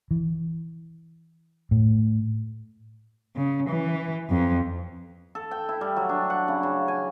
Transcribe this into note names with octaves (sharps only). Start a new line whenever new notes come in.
E3
A2
C#3
E3
F2
A4
G5
E4
G3
F#3
D4
F#5
C#3
C#3
G#5